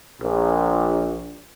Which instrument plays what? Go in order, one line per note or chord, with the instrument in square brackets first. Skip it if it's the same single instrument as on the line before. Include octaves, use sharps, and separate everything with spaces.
[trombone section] A#1